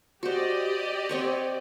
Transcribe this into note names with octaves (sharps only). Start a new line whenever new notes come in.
F#4 G4 C5 D5 D#5
C4 C#5 F#5